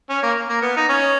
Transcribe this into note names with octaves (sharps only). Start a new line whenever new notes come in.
C#4
A#3
A#3
B3
D#4
C#4